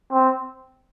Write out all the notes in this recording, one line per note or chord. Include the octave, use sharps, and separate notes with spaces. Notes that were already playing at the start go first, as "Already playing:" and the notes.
C4